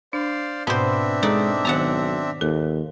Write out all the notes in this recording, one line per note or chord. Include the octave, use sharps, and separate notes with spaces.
D4 C5 D5 F5
G#2 B2 B3 C4 D4 C5 E5
G#3 D#4 A4 D5
B1 D#3 B3 F#5 A5 A#5
D#2 A4